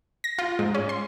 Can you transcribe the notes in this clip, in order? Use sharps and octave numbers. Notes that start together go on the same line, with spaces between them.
A#6
F4
G#2
C#4
C6